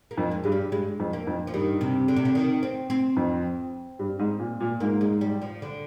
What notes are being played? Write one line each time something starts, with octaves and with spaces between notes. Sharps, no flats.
A#3
F2
G#3
G2 G#3
G3
G2 G#3
F2
A#3
F2
F3
G2 D#3
C3
D3
C3
D3
D#3
C4
C4
F2
G2
G#2
A#2
A#2
G#2 A#3
G#3
G3
F3
D3